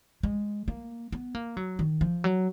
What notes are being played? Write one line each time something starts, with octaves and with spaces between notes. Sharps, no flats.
G#3
A#3
B3
A#3
F#3
D#3
F3
F#3